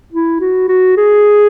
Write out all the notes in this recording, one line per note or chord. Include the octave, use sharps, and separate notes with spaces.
E4
F#4
F#4
G#4